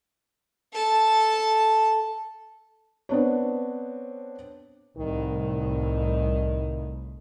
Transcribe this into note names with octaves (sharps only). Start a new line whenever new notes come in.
A4 A5
B3 C4 D4 C#5
C2 A2 D#3